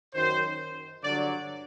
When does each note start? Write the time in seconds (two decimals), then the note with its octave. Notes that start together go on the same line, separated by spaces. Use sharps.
0.14 F#2 D#3 F#3 C5
1.03 G2 D3 F#3 D5